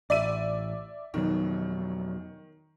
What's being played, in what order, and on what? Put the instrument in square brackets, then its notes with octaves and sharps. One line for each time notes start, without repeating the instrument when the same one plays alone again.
[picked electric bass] A1 [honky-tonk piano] D5 E5 D#7
[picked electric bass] F2 B2 F#3 [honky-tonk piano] D#3